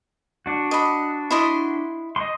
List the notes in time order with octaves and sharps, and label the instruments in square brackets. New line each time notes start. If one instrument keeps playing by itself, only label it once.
[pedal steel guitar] D4 F#4
[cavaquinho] D#5 B5
E4 D#5 C6
[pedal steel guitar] D#5 C6